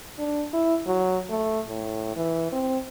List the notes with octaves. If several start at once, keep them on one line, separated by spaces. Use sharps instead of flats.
D4
E4
F#3
A3
A2
E3
C4